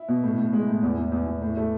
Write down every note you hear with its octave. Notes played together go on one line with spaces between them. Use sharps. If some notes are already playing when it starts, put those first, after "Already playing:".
Already playing: E4
B2
A2
A2
G#3
A2
E2
E2
E2
E2
A2
A3